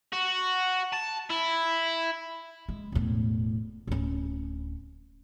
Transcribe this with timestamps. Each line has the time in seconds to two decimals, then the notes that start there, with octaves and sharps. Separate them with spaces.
0.13 F#4
0.93 A5
1.30 E4
2.69 G#3
2.92 E1 A2
3.87 D1 C#4